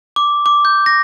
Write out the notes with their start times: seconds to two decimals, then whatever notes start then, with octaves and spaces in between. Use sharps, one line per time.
0.16 D6
0.46 D6
0.65 G6
0.86 A#6